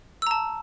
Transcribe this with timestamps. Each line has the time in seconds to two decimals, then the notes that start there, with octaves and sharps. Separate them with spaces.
0.22 E6
0.27 A#5
0.31 A5